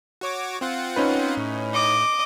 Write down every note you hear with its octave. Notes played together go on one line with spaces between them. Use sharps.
F#4 C#5 D6
C4 F4 F#5
C#4 D#4 B4
A2
D#5 D6